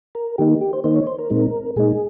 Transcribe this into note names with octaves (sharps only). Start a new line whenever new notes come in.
A#4
D#3 A#3 D#4 G4
G4
C5
D#3 A#3 D#4 C5
C#5
C5
A#4
A#2 G#3 C4 D#4
A#2 G#3 D#4 G#4